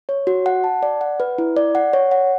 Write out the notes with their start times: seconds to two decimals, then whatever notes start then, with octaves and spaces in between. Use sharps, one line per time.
0.09 C#5
0.27 F#4
0.46 F#5
0.64 A5
0.83 D5
1.01 F#5
1.20 B4
1.38 E4
1.57 D5
1.75 F#5
1.93 C#5
2.11 F#5